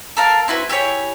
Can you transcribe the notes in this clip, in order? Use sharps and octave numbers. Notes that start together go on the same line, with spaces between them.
A4 A#4 F5
C4 E4 F#4 B4
E4 G4 G#4 C#5